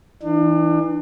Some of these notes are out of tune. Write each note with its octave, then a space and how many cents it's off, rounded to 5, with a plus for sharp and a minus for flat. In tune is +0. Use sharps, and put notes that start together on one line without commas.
E3 -15 D4 +35